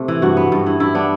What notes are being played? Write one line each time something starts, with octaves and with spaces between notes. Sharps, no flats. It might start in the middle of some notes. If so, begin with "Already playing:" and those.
Already playing: C3 A3
E3
G2 F#4
B3
G2
E3
G2 E4
B3 D4